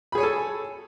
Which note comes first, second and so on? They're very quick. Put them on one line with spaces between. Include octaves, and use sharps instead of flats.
B5 G#4 C#5 G#5 A4